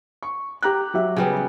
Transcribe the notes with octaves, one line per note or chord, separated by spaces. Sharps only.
C#6
G4 A#5 F#6
F#3 G4 E5
C#3 G3 B3